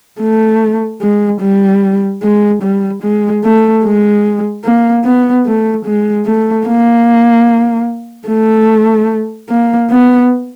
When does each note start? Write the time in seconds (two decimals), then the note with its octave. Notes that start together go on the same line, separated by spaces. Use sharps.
0.20 A3
1.01 G#3
1.41 G3
2.23 G#3
2.62 G3
3.03 G#3
3.44 A3
3.84 G#3
4.64 A#3
5.05 B3
5.46 A3
5.86 G#3
6.26 A3
6.67 A#3
8.28 A3
9.49 A#3
9.90 B3